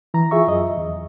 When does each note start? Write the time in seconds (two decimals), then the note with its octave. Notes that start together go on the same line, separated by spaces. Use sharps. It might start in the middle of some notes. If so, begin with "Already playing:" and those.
0.14 E3 A#5
0.31 F4 G#4 E5 C#6
0.47 F#2 D#5
0.77 E2